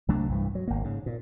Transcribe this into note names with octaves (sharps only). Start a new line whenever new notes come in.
C2 F#3 A3 D4
C2 G2 E3
F#3
G#1 A#3
G#2 C#3
A#2